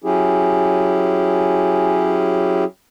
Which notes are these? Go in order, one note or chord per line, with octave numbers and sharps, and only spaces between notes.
F#3 C#4 E4 G4 G#4